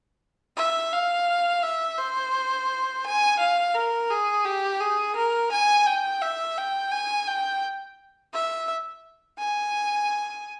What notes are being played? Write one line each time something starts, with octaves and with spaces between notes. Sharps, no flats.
E5
F5
E5
C5
G#5
F5
A#4
G#4
G4
G#4
A#4
G#5
G5
E5
G5
G#5
G5
E5
G#5